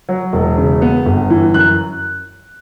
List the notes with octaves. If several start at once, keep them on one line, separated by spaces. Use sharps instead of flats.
F#3
E1
C#3
B3
G1
E3
F#2 F#6